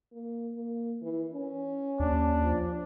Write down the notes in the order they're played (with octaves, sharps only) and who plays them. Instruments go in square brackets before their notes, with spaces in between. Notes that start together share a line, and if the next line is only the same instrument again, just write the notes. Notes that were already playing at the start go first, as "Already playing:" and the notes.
[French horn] A#3
A#3
E3
C#4
[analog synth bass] D#2 [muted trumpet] D4
[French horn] F3